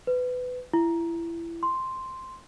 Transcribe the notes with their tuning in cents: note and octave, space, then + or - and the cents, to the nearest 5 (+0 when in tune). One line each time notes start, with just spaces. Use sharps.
B4 +20
E4 +25
C6 +0